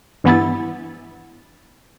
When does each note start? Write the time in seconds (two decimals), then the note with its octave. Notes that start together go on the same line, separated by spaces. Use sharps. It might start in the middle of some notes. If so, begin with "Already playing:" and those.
0.24 G2 E3 B3 E4 A6